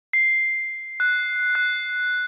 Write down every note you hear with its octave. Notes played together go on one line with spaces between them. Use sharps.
C7
F#6
F#6